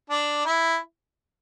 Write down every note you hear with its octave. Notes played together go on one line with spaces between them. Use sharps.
D4
E4